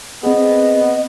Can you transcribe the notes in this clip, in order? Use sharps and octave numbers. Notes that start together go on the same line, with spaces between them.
B3 C4 G#4 D#5